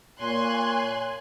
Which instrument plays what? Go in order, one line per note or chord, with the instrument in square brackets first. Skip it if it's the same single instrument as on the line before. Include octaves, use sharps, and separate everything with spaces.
[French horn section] A#2 C#5 [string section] G#5 C6 F#6